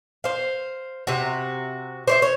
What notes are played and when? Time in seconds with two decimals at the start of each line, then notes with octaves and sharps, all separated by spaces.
0.24 C5 F5
1.07 C3 F#4
2.07 C5 C#5 E5
2.22 C#5